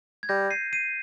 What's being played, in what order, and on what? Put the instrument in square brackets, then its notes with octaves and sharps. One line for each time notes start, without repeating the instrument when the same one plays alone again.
[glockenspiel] G#6
[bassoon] G3 [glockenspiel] G6 A#6
[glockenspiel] C7 D#7
C7 D#7